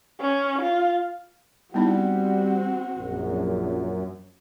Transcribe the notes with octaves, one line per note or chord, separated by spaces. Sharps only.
C#4
F4
G3 B3 C4 D#4 E4 F#4
A#1 F#2